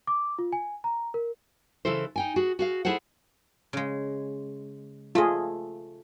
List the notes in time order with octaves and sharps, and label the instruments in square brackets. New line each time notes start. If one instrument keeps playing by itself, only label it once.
[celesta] D6
F4
G#5
A#5
A#4
[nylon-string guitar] C#3 E3 E4 A4 C5
D#4 G5 G#5
F#4 G#4
F#4 G#4 F5
E4 G#4 A4 C5 F#5
[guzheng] C#3 G#3
[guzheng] A3 D#5 [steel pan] F4 G#4